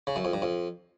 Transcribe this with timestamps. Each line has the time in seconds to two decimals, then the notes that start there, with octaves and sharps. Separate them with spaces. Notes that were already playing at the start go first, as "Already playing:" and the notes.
0.07 C#3
0.16 F#2
0.25 F2
0.33 G2
0.42 F2